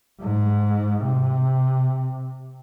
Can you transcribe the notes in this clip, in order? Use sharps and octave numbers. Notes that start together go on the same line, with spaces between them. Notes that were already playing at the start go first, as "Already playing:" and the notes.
G#2
C3